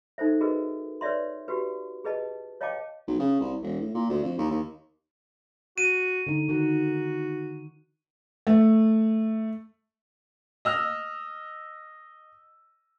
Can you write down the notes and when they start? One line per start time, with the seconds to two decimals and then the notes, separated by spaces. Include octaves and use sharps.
0.18 D#4 A4 C5 E5
0.41 F#4 G#4 A#4 B4 D#5
1.01 B4 C#5 D5 E5 C6
1.48 F#4 G4 B4
2.04 G#4 B4 D#5 A5
2.61 C#5 D#5 F5 G5 A5 D6
3.07 B1
3.19 C#3
3.40 C2
3.62 E1
3.81 A2
3.94 A#2
4.10 D2
4.23 F2
4.38 D#2
4.50 D#2
5.78 F#4 D#7
6.27 D3 D#4
6.49 D#3 D#4 F#4
8.47 A3
10.65 D#5 E6 F6